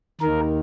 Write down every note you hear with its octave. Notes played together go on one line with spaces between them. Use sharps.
D#2 D#3 A#4